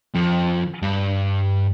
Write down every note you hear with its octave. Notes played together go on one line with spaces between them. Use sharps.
F2
G2